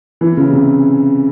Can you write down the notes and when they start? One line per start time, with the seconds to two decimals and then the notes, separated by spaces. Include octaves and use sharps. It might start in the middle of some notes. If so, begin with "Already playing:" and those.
0.21 E3
0.37 C#3
0.53 C3